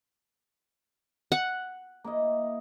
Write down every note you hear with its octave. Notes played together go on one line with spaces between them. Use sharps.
F#5
A#3 E4 D#5